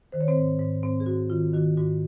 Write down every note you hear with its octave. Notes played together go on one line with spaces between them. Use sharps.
D#3 C5
C#5
C4 C5
G#2
G#2
G#2 C4 C5
G#4
G#2 F#4
D#3 F4
D#3 F#4
G#2 F#4